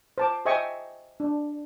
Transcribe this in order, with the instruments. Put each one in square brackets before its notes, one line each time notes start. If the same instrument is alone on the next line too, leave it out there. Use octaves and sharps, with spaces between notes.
[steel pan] C5 A5 D6
C5 D#5 E5 G5 G#5 C#6
D4